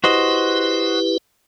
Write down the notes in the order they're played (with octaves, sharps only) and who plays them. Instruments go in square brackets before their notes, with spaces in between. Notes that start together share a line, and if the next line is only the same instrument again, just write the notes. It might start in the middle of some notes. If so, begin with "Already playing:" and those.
[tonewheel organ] E4 G4 B4 [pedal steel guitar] F#4 C5 D#5